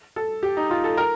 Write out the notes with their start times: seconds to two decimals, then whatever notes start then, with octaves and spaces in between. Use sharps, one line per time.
0.16 A4
0.43 G4
0.57 D#4
0.71 F4
0.84 A4
0.97 A#4